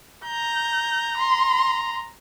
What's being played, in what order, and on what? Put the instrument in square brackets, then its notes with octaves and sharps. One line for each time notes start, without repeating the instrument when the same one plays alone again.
[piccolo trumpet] A#5 [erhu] G6
[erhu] C6